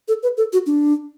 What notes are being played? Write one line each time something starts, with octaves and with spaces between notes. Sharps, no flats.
A4
B4
A4
F#4
D4